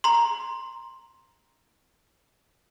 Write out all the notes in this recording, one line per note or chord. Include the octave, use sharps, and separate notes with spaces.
A#5 C6